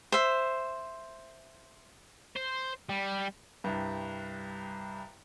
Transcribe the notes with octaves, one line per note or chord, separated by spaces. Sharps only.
C5 E5
C5
G3
C2 G2